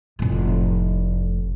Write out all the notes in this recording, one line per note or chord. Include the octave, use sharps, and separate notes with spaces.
F1 A2